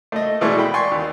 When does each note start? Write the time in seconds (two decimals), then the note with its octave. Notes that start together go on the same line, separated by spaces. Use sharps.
0.12 A3 D#5
0.41 B2 E3 G#3 A3 D5 C#6
0.58 G5 B5
0.74 D5 G5 G#5 C6 C#6
0.92 D#2